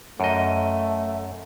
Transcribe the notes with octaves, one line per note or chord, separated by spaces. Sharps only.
F#2 A3 D#5